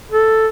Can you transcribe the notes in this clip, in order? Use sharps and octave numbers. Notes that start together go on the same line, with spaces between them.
A4